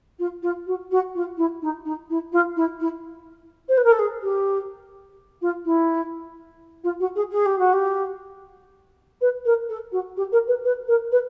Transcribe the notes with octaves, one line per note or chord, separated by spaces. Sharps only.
F4
F4
F#4
F#4
F4
E4
D#4
D#4
E4
F4
E4
E4
C5
B4
A#4
A4
G#4
G4
F4
E4
F4
F#4
G#4
G#4
G4
F#4
G4
B4
A#4
A4
F#4
G4
A#4
B4
B4
A#4
B4